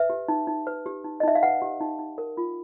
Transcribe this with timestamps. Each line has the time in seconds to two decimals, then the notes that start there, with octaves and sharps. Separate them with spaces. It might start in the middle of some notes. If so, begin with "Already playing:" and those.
Already playing: B4 E5
0.10 G4
0.28 D#4
0.47 D#4
0.67 B4
0.86 G4
1.04 D#4
1.20 D#5
1.23 D#4 E5
1.35 F5
1.43 B4 F#5
1.62 G4
1.80 D#4
1.99 D#4
2.18 A#4
2.37 F4